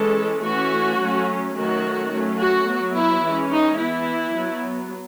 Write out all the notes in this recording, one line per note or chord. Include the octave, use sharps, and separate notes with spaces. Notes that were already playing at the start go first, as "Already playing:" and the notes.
Already playing: E3 G#3 C#4 A4
E3 A3 C#4 F#4
F#3 A3 C#4
D#3 F#3 A3 C#4 F#4
F#3 A3 C#4
F#4
F#3 B3
E4
E3 G#3 C#4
D#4
E3 B3 E4
F#3 B3